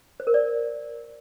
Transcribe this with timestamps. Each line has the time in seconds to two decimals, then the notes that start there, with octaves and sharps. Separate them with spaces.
0.20 C5
0.27 A#4
0.34 D5